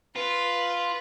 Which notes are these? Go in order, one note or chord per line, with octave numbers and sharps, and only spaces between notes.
F4 B4